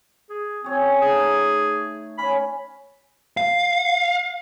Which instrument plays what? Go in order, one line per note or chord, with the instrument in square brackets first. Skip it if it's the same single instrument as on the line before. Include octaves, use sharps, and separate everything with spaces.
[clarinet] G#4
[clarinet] C4 [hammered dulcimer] G#4 C#5
[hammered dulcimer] A3 D#4 [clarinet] G#4
[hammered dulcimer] C#4 [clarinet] B5
[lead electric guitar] F5